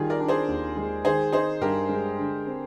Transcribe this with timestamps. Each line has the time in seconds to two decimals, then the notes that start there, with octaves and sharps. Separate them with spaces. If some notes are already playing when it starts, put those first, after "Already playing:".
Already playing: D#3 G3 F4 G#4
0.10 A#4 D5
0.20 D4
0.28 G#4 C5
0.48 D#2
0.77 G#3
1.05 D#3 G#4 C5
1.32 D#4 G#4 C5
1.61 G2 G4 A#4
1.89 G#3
2.18 D3
2.47 C4